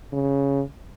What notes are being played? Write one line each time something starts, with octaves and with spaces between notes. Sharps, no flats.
C#3